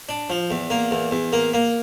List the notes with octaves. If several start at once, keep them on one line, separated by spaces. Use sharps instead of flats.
D4
F3
E2
A#3
E2
E2
A#3
A#3